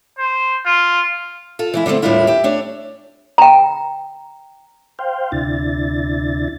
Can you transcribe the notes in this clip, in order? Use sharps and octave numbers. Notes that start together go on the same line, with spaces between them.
C5
F4
F4 A4
E3 G#3 E4
D3 F#3 G3 A3 C4
D#2 A2 G3 D4 E4 F4
G4 E5
A3 D4 C#5
G5 A#5
C5 F5 G5
D2 C3 D4 E4 A6